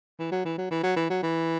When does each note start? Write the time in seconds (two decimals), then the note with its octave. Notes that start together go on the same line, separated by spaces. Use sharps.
0.19 E3
0.32 F#3
0.45 E3
0.58 F#3
0.71 E3
0.83 F#3
0.96 E3
1.10 F#3
1.23 E3